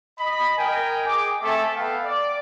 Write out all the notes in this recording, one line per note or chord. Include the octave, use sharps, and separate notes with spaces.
D#5 B5
A#4 D#5 G5 G#5
G#4 D6
A3 C4 A4 E5 G#5
B3 A4 B4 F5 G5
D5